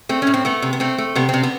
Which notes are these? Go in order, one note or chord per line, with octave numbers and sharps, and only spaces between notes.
A3 C4
A2 C#4
C4
A3 B3
C3
B3
A3 C4
A3
C3 B3
C3 C4
B3